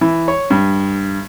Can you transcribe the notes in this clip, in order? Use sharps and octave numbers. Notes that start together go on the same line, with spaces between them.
E3
C#5
G2